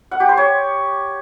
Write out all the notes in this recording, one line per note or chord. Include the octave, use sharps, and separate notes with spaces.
F#5
G4
C5
C#5